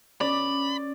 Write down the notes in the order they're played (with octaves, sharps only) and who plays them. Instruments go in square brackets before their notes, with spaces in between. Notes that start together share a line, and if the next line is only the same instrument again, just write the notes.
[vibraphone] C#4 [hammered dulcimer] D5 [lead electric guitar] B5